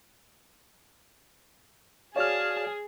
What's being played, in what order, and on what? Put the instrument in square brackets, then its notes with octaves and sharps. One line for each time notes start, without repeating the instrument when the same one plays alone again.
[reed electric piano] F#4 D5 F5 [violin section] G#4 [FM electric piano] C#5 F6 [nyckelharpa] A5